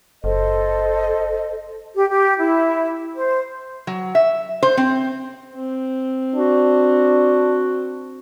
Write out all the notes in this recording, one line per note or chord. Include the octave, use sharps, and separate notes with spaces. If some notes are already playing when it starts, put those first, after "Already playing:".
F#1 A4 C5 D#5
G4
G4
E4
C5
F#3
E5
C5
C4
C4
D4 F#4